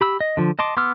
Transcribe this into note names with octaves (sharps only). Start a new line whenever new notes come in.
G4 B5 E6
D#5
D3 F3
D#5 A5 C6 D6
B3 C6 D6 E6 F6